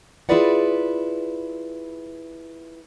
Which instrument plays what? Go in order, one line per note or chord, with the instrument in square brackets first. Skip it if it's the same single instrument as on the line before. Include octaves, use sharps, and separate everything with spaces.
[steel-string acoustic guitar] E4 F4 G#4 B4 D5 F#5